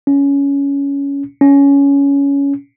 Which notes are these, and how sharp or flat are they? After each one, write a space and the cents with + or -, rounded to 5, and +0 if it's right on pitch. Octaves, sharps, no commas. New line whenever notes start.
C#4 +15
C#4 +15